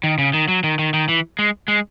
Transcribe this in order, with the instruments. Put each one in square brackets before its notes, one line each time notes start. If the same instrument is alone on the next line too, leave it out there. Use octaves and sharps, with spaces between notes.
[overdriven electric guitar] D#3
C#3
D#3
F#3
D#3
D#3
D#3
E3
G#3
G#3